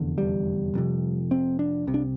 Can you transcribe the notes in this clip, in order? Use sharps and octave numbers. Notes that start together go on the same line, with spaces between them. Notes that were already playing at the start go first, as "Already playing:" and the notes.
Already playing: F1 E2 D3
G3
F1 F2 C3
C4
D4
C2 C3
D4